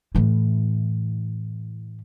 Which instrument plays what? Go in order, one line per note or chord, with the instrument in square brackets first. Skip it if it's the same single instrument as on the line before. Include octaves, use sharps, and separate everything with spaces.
[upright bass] A2 E3